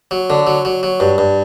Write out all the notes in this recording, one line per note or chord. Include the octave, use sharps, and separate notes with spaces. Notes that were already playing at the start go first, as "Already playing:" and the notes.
F#3
D3
F#3
F#3
F#3
G2
G2